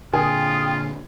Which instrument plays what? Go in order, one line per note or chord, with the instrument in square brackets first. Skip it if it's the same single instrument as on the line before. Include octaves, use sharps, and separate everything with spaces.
[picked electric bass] A#2 D3 [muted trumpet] F4 [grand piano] G#4 [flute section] G5 D#6